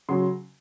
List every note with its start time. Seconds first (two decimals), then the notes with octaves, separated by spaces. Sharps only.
0.09 C#3 F#3 C6